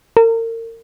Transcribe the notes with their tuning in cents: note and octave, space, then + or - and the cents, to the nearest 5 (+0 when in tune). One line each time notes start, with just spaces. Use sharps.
A#4 -35